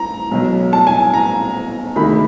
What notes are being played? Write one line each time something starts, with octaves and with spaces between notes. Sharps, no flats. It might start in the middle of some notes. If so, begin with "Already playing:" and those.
Already playing: A#5
B1 B2 F#3
A5
G#5
A#5
D2 C3 D#3 G#3 B5